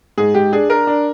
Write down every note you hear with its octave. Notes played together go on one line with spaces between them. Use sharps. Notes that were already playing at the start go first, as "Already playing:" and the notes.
G#2 G#4
G#2 G4
D4 G#4
D4 A#4
D4